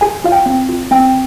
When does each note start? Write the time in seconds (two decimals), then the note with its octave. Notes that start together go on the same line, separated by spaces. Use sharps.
0.01 G#4 G#5
0.24 F4 F5
0.32 G5
0.46 C4
0.69 F4
0.91 C4 G5